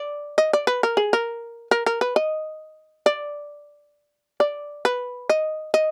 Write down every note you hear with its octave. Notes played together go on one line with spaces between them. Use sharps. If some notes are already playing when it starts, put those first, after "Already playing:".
Already playing: D5
D#5
D5
B4
A#4
G#4
A#4
A#4
A#4
B4
D#5
D5
D5
B4
D#5
D#5